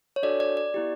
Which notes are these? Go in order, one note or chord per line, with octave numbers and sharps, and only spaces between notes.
C#5
D4 F#4 A4 D5
D5
D5
B3 E4 G4